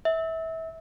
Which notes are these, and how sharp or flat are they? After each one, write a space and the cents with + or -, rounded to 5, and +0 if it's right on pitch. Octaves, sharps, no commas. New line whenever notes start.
E5 -25